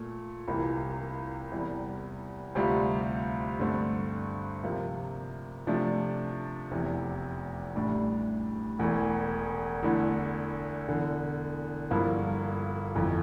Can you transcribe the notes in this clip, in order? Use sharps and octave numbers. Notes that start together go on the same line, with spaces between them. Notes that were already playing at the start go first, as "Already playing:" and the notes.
Already playing: A#2 A3
C2 C3 E3 A#3 F4
E2 C3 G3
D2 C3 G3 C4 F4
G2 D3 A3 C4
C3 F3 A#3
C3 F3 A3 D4
F1 E2 C3
A1 A2 G3 D4
E1 E2 E3 A3
E2 D3 A3 E4
E1 E2 D3
G1 G2 F3 A#3 E4
G1 F2 E3